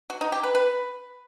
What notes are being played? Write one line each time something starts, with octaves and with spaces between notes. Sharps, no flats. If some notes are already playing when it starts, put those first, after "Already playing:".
F#4
D#4
G4
B4
B4